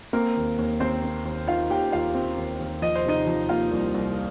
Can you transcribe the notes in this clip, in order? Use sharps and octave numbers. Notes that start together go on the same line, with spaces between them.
A#3 C4 A#4
D#2
D#2
D#2 C4 C5
C4
D#2
D#3 F4 F5
D#2 G4 G5
D#2 F4 F5
C4
D#2
D#2
F3 D#5
C5
C3 D#4 D#5
F3
A#3 F4 F5
C2
C2